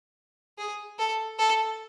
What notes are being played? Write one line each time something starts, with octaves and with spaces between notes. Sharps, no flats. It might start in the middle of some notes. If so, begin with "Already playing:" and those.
G#4
A4
A4